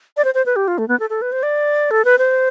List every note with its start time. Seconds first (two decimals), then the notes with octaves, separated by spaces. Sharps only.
0.17 D5
0.24 C5
0.35 C5
0.46 B4
0.56 G4
0.68 F4
0.78 A3
0.88 B3
1.00 A4
1.10 A4
1.22 B4
1.32 C5
1.43 D5
1.91 A4
2.05 B4
2.18 C5